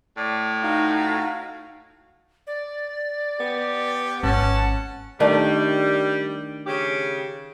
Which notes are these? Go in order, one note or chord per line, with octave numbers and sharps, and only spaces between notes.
A2 D5
D#4 F#4 F5 A#5
D5
B3 G4
G#1 C#4 F#5 A5
D#3 G3 A3 D4
C#3 G4